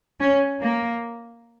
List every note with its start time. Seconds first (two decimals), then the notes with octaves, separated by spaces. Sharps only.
0.20 C#4
0.61 A#3